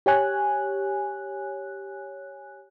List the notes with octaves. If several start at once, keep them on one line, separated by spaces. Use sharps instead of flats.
G4 C#5 G#5 F#6